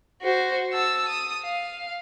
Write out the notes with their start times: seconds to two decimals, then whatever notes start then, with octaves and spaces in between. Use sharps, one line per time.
0.22 F#4 C5
0.73 A5 E6
1.09 D#6
1.43 F5